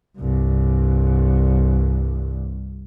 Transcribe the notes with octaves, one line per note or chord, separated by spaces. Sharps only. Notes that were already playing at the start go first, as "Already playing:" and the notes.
C2 G2